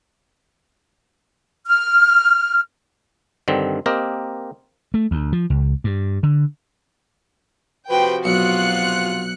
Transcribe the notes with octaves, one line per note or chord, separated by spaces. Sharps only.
F6
G2 D3 D#3 C4
A#3 C4 G4 A#4 D#5
A3
D2
F3
C#2
G2
D3
C3 F3 F#4 G4 B4 C5 G5
B1 F4 F#6 C#7